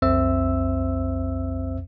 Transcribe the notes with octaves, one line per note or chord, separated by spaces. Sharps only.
B1 F2 C4 C5 E5 E6